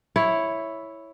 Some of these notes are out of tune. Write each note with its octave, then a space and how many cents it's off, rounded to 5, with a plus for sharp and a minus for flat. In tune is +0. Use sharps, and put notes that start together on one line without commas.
E4 +0 C#5 +0